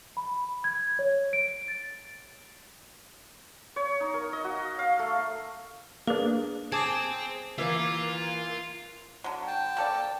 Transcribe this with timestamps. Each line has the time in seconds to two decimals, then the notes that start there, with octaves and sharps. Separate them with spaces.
0.17 B5
0.64 G#6
0.99 C#5
1.33 D7
1.68 A6
3.76 C#5
4.00 D#4
4.14 A#4
4.33 D#5
4.44 F#4
4.79 F5
4.99 A3
6.07 A#3 D4 G#4 B4
6.72 C4 G#4 A5 D6 G#6
7.58 E3 A#3 F4 E5
9.24 D3 F#3
9.47 G5 A5
9.77 A#3 A4 D5